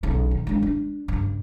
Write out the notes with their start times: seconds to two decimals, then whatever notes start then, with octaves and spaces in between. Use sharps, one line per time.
0.03 B1 C#3
0.31 D#3
0.47 G#3 D4
0.62 D4
1.08 G2 C#3